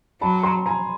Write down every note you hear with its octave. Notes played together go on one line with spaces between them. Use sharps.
F#3 A5 B5
A#5 C6
G#5 A#5